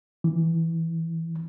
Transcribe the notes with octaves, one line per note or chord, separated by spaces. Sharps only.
E3